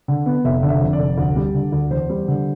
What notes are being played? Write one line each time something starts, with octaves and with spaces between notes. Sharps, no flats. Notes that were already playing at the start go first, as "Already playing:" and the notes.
D3
B3
F1 E5
D3
E5
F2
D5
F1
D2
G3
D3
D2
E2 C5
G3
D3